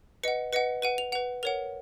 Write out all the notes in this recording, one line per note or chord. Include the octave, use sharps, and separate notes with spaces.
B4 D#5 F#5 C#7
B4 D#5 F#5 C#7
B4 F#5 D#7
F7
B4 F#5 F7
A#4 C#5 F#5 F7